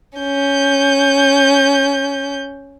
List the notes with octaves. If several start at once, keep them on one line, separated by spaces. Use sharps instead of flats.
C#4 G6